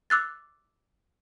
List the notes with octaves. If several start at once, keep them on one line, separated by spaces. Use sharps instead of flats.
D6 E6 F#6 A6